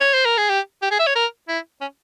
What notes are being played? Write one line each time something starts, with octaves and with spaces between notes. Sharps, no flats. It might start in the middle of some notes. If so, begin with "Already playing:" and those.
C#5
C5
A#4
G#4
G4
G4
G#4
E5
C#5
A#4
E4
C#4